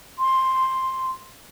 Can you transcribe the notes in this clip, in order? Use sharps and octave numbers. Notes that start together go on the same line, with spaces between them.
C6